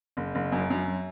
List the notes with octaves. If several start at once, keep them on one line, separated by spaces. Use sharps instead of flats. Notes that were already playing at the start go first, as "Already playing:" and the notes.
F#1
F#1
F#2
F#2